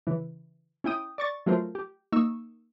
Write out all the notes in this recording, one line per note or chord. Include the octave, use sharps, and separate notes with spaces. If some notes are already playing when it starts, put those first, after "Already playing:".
C#3 E3
C#4 E4 G5 D#6
D5 C#6 A6
F#3 A3 F4 A#4 C5
G4
A#3 D#4 C#6 E6